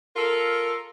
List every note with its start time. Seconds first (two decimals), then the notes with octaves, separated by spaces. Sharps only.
0.16 F4 A4 A#4